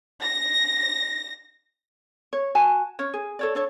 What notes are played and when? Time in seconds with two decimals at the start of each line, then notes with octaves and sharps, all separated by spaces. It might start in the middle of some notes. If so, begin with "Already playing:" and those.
0.24 A#6
2.33 C#5
2.55 F#4 G#5 A5
2.99 C#4 C#5
3.14 G#4
3.39 A4 C#5 D5
3.55 D4 A4 C#5